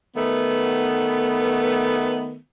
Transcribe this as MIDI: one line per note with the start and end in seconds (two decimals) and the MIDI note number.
0.16 2.38 51
0.16 2.38 57
0.16 2.38 59